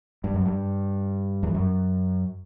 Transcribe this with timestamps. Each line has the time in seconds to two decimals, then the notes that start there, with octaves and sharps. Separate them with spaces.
0.24 G2
0.34 F#2
0.46 G2
1.43 E2
1.55 F#2